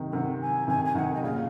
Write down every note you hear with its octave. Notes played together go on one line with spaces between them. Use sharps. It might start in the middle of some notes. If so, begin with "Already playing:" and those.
Already playing: C3 D#3
C3 D#3 F#5
G#5
C3 D#3 G#5
G#5
C3 D#3 F#5
D#5
A#2 C#3 F5